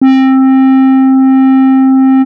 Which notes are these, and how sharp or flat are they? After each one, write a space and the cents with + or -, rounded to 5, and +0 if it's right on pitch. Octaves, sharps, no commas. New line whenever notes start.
C4 +20